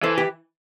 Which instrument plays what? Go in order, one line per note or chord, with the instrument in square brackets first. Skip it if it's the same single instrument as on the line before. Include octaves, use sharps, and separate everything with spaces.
[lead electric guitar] E3 [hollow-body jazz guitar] A4 C5
[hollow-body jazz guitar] G4 B4